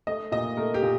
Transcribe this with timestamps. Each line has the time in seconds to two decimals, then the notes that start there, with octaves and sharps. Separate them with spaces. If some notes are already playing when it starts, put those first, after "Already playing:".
0.07 A3 D#5
0.32 A#2 D#5
0.57 A3 A#4
0.74 G4
0.83 A#2